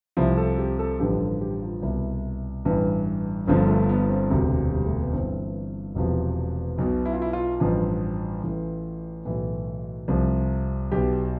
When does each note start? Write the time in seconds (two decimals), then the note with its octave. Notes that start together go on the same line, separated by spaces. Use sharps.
0.17 C2 C3 F3 E4
0.37 A4
0.59 G4
0.79 A4
1.00 A1 G2 D3 F3 G4
1.21 A4
1.41 G4
1.62 F4
1.82 C2 B2 E4
2.65 A1 G2 E3
3.47 G1 G2 D3 F3 C4
3.68 A3
3.89 B3
4.09 C4
4.30 E1 D2 C3
4.72 G3
4.86 A3
4.99 B3
5.13 G1 G2 E3 C4
5.95 E1 E2 C3 F3
6.78 B1 B2
7.06 E4
7.13 F4
7.22 E4
7.33 F4
7.60 A1 G2 F3 F4
8.43 A1 A2 E3
9.25 B1 A2 E3
10.08 C2 C3 F3
10.92 B1 B2 G4